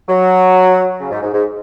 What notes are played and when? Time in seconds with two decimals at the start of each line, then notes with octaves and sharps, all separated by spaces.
0.09 F#3
1.00 C#3
1.11 G#2
1.22 G#2
1.33 G#2